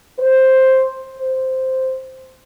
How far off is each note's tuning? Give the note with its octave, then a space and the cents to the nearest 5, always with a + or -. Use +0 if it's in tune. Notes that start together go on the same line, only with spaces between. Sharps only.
C5 +5
C5 -5